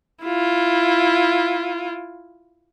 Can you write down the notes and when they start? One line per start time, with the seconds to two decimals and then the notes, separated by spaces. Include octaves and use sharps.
0.24 E4 F4